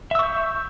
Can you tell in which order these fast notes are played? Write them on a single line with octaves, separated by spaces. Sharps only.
E5 E6 C#6 G6